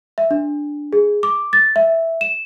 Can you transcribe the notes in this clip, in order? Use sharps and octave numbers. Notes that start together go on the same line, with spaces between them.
E5
D4
G#4
D6
A6
E5
E7